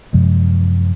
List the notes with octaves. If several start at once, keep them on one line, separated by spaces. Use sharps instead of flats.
F#2 C3 F3 G#3